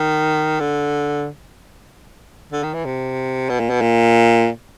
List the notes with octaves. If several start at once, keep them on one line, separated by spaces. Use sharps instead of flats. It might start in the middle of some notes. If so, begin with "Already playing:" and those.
Already playing: D#3
D3
D3
D#3
E3
C3
B2
A#2
B2
A#2